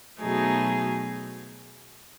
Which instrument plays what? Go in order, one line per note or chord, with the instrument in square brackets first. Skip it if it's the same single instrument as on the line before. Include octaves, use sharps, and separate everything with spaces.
[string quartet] B2 F#3 A3 D#4 G#4